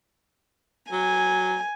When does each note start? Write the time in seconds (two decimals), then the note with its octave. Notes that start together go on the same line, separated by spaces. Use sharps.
0.92 F#3 G#5